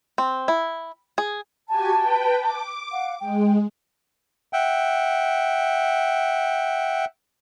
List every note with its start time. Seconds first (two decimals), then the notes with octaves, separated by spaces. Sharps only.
0.18 C4
0.48 E4
1.18 G#4
1.68 F#4 G4 G#5 A5
1.97 B4 G5
2.39 D6
2.91 F5 F#5
3.20 G#3 G5
4.53 E5 F#5 G5